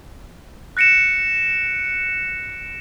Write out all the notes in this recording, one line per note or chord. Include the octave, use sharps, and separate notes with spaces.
F#6 A#6 C#7 D7 E7